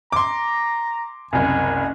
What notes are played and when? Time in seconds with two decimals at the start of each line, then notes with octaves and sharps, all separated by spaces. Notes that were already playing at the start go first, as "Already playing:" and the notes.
0.12 A#5 C6 D6
1.33 F#1 C2 G#5